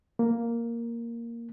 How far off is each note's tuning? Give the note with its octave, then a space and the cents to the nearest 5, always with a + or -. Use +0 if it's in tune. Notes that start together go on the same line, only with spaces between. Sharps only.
A#3 +0